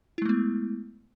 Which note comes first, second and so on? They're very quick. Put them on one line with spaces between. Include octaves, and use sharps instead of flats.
E4 G#3 A3 B3